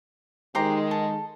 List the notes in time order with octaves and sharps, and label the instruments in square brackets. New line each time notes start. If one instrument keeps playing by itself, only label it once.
[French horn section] D#3 G#3 [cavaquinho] G4 C5 A#5
[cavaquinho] A4